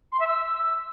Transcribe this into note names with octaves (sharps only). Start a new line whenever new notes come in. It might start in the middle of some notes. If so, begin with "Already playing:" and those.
C6
E5
E6